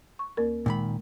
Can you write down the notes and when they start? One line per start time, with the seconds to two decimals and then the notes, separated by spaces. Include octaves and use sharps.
0.19 C#6
0.37 D2 A#3 A#4
0.66 A#2 D#3 G#3 B5